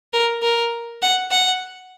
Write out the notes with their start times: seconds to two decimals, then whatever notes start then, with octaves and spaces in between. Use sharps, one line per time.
0.13 A#4
0.42 A#4
1.02 F#5
1.31 F#5